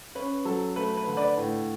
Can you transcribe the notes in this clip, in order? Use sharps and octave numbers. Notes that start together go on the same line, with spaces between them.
C#4 B4
F#3 A4
A3 B4
B4
D3
B4 D5
A2